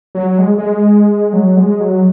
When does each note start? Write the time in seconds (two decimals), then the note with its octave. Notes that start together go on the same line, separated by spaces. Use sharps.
0.15 F#3
0.38 G#3
0.58 G#3
1.33 F#3
1.57 G#3
1.80 F#3